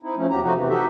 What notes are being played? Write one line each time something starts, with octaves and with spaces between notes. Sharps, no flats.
C4 D#4 E4
F3 A3 C#4
E2 F#3 G4 A#5
C3 F3 A3 D#4 F#4
C3 E3
D#4 F#4 G4 A4 E5